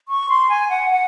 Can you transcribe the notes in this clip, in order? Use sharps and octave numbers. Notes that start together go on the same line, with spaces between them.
C#6
C6
G#5
F#5
F#5